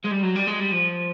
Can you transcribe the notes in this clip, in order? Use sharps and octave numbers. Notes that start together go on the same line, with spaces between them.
G#3
G3
F#3
G3
G#3
G3
F3